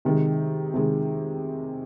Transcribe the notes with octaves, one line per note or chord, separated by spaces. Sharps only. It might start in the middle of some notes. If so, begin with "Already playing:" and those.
C3 D#3 G#3
C3 D#3 G#3